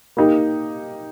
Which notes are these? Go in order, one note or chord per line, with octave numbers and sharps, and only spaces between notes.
A#3 D#4 G4